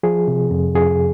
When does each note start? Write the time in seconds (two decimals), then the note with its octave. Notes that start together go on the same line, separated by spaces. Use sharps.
0.03 F3 G#4
0.28 C3
0.51 F2
0.75 F2 G#4